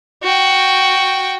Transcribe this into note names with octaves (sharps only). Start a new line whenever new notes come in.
F#4 G5